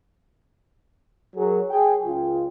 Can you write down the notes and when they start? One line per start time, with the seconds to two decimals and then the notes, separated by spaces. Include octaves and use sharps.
1.36 F#3 G#4 A#4
1.70 G#4 G5
2.04 C#2 F4